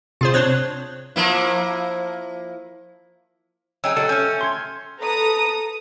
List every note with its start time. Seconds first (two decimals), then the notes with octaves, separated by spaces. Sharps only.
0.21 C3 F4 G#4 C5
0.34 C4 D4 C5 C#5 F#6
1.16 F3 A#3 E4
3.84 F#3 D#4 G#4 G5 E6
3.97 F#3 G3 F#4 A4
4.09 A3 C#4 F6 G6
4.41 C6 G#6
4.99 A4 B4 A#5 D#6